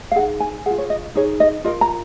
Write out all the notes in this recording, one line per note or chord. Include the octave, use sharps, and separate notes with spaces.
F5
D#4 G#4 F#5
G#5
F4 G#4 F#5
C#5
D#5
D#4 G#4 C#5
D#5
F4 A#4 D#5
A#5